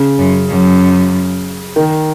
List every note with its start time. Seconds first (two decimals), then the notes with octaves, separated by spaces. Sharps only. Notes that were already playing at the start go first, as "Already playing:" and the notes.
Already playing: C#3
0.19 F#2
0.50 F#2
1.76 D#3